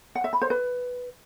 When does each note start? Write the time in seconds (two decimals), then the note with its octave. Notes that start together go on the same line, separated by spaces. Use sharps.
0.15 F#5
0.24 E5
0.33 B5
0.42 C5
0.50 B4